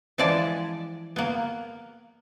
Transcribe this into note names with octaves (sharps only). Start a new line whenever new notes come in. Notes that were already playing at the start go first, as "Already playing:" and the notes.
E3 F3 G#3 D5 G#5 A5
A#3 B3